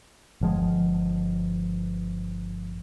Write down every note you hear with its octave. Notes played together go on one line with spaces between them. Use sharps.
G1 F3 G#3